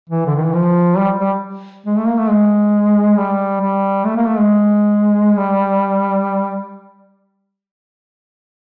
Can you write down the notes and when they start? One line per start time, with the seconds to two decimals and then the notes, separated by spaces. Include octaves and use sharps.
0.09 E3
0.26 D3
0.36 D#3
0.45 E3
0.53 F3
0.98 G3
1.20 G3
1.86 G#3
1.97 A3
2.07 A#3
2.19 A3
2.30 G#3
3.17 G3
3.62 G3
4.05 A3
4.16 A#3
4.26 A3
4.38 G#3
5.36 G3